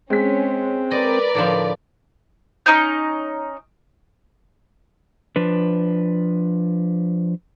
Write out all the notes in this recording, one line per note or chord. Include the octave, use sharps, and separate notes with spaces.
G#3 C4 C#4 B6
A#4 B4 D5 D#5
A2 D3 F3
C#4 D#4 D#5 G6
F3 D4 B4